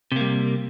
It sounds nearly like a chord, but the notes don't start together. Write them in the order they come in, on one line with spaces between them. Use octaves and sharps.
C3 A#3 G3